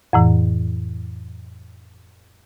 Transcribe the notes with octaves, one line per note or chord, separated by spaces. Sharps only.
F2 A2 E3